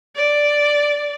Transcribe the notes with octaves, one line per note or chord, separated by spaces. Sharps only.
D5